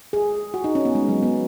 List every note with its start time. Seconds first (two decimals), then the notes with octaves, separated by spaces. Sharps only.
0.13 G#4
0.54 F#4
0.64 D#4
0.75 C#4
0.85 B3
0.95 G#3
1.09 F#3
1.23 B3